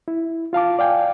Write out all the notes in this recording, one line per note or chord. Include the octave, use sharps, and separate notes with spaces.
E4
F4 F5 A5 D6
D5 F5 G5 G#5